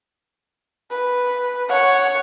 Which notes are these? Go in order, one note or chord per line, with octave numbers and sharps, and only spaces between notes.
B4
C#5 F#5